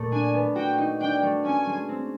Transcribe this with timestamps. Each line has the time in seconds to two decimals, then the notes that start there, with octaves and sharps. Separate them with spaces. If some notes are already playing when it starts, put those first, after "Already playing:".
Already playing: A#2 A3
0.12 D4 G#5
0.34 B3
0.56 F#4 G5
0.78 D#4
1.00 D4 G5
1.23 A3
1.45 C#4 G#5
1.67 G#3
1.89 C4